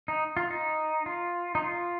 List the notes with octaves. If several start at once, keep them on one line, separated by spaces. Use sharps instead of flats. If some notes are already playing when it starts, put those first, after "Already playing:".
D#4
F4
D#4
F4
D#4
F4